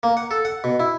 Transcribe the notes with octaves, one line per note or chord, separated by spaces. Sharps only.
A#3
F#5
A4
F#5
B2
E4